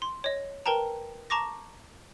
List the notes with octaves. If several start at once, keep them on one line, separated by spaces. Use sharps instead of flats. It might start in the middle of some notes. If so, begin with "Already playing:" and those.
C6
C#5 D#5
A#4 B4 G5 A5 A#5
A5 A#5 C#6 D6 A#6